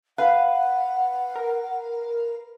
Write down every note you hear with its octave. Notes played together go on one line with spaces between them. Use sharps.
B4 F5 F#5
A#4